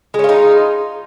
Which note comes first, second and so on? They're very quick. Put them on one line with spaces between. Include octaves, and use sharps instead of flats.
G#3 C#4 F4 D#4